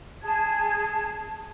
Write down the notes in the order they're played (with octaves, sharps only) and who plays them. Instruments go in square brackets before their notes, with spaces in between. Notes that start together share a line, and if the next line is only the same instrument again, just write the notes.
[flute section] G#4 A5 G#6